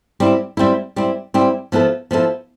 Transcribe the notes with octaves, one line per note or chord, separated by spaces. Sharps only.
G3 C4 E4
G3 C4 E4
G3 C4 E4
G3 C4 E4
F3 B3 E4 A4
F3 B3 E4 A4